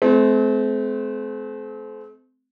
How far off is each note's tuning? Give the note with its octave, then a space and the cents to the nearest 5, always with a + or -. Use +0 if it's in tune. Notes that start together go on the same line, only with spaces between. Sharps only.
A3 -45 C4 -25